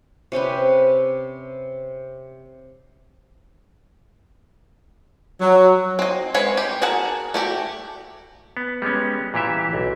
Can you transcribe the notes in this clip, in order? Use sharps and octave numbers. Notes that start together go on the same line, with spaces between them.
C3 C#4 G4 B4
F#3
C4 D#5
G#3 C4 B4 C#5
G4
F#4 G#4 A#4 F#5 A5
A3 F#4 G4
B3
G3 G#3 B3 C#4
A#2 E3 G4 E5
B1